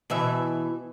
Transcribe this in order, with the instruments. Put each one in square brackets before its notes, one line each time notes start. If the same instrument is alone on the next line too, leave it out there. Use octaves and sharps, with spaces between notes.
[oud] B2 E3 E5